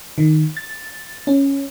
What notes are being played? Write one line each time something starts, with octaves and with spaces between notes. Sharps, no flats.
D#3
A6
C#4